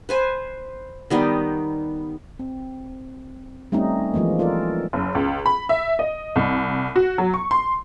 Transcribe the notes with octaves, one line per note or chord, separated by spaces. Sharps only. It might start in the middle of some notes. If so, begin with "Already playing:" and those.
B4 C5 G#5
D#3 G3 B3 D#4
C4
G3 A3 C4 C#4 D#4
E3 F3 G#3 A#3
F4 A4 A#4 D5
F#1
C#2
B5
E5
D#5
C2
F#4
F#3
C#6
C6